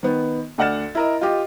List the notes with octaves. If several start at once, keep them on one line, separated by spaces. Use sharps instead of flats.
D#3 B3
D2 D5 F#5 F6 A6 E7
E4 A#4 D#5
F4 G4 D#5